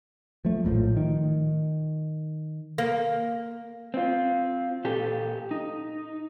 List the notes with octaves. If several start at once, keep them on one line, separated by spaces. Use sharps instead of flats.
F3 A3
A#1 A2 D#3 F3
D#3
A#3
C4 F4
A#2 G4 A4
D#4